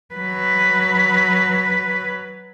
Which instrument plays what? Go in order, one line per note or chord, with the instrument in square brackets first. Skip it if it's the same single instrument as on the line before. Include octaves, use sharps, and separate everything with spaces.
[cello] F#3 B4